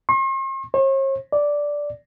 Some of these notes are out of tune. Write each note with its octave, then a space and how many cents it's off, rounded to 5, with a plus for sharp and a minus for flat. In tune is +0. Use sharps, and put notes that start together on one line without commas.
C6 +45
C#5 -45
D5 -5